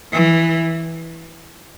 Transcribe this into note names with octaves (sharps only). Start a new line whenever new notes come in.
E3